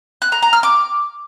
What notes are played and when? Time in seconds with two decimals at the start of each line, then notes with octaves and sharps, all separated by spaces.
0.22 F#6
0.32 A#5
0.42 A#5
0.53 F6
0.63 D6